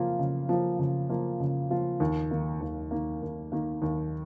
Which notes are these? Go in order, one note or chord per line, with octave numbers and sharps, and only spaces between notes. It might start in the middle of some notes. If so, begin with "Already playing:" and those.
Already playing: C#3 F3 A#3 F4
C#3
F3 A#3 F4
C#3
F3 A#3 F4
C#3
F3 A#3 F4
D#2
D#3 A#3
D#2
D#3 A#3
D#2
D#3 A#3
D#2